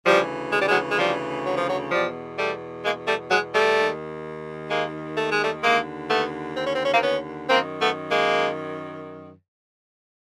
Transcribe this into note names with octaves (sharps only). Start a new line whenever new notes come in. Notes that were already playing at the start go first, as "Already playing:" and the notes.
D2 C#3 E3 F3 G3
G#3
G3
F#3 G#3
G#3
F3 G3
F#3
F3
F#3
E2 B2 F3 G3
G3 A3
G#3 A#3
G3 A3
F#3 G#3
G3 A3
D#2 D#3
G#3 A#3
A3
G#3
G3 A3
D#2 D3 G#3 A#3
A3 B3
C4
C#4
C4
C#4
A#3 C4
B3 C#4
F#2 D#3 A#3 C4
A3 B3
G#3 A#3